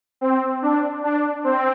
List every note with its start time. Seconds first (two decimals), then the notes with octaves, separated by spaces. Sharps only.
0.21 C4
0.62 D4
1.04 D4
1.44 C4